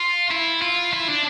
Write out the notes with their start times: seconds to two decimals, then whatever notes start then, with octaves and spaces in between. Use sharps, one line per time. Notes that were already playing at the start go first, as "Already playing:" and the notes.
Already playing: F4
0.31 E4
0.62 F4
0.93 E4
1.08 D4